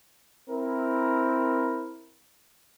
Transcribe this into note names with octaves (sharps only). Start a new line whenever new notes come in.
C4 E4 A#4